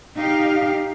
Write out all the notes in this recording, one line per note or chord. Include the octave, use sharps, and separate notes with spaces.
D#4 G4 F5